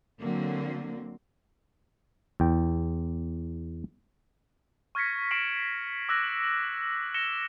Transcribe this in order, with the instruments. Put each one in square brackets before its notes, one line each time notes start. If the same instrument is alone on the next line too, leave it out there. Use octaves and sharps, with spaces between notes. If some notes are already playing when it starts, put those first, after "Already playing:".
[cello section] D3 F#3 A#3 C4
[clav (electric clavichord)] E2 G5
[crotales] C#6 F6 G#6 A#6 B6 C#7
C#6 A#6 C7 D7 E7 F#7
D6 E6 F#6 A#6
A#6 C#7 E7 G7